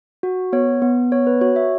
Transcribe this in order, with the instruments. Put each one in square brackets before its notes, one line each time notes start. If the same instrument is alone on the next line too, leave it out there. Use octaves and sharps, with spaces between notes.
[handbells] F#4
B3 C#5
B3
B3 C#5
B4
F#4 C#5
E5